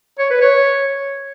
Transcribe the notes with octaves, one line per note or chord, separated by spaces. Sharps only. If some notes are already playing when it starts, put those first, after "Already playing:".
C#5
B4
C#5